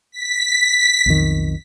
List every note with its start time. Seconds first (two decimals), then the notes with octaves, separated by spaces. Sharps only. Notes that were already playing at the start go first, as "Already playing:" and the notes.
0.11 B6
1.06 B1 F2 D#3